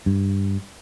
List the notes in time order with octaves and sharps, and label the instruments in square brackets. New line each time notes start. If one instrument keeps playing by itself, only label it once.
[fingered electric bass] G2